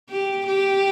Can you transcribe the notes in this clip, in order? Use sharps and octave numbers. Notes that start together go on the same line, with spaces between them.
G4
G4